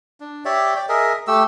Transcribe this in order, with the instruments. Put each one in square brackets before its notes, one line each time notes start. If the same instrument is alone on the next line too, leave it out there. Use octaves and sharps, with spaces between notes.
[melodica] D4
G4 C#5 D5 E5
D5 G5
G#4 A#4 D#5 E5
A3 G4 E6